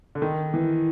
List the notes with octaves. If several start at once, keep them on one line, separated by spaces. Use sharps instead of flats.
D3
D#3
E3